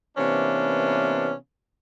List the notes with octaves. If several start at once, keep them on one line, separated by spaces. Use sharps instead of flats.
C3 E3 A#3 B3 C#4 D4